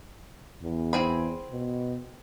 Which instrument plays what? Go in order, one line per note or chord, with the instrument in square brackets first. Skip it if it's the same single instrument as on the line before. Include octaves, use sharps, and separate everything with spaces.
[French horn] E2
[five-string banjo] C4 G#4 B5
[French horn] B2